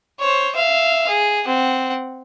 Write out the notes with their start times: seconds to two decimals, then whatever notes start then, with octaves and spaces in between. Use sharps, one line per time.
0.19 C5 C#5
0.55 E5 F5
1.08 G#4
1.45 C4 F#5